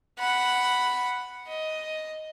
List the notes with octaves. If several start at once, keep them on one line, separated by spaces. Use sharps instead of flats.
F#5 B5
D#5